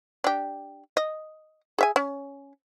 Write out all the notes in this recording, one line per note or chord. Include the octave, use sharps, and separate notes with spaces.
D4 G4
D#5
G#4 E5 G#5
C#4